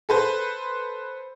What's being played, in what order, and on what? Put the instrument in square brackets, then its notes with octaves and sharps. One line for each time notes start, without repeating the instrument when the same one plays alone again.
[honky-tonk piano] A4 B4 C5